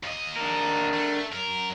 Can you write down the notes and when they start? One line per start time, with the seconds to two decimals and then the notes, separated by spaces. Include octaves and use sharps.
0.03 D#2 D#5
0.36 D4 A#4
0.93 A3
1.32 F#2 A#4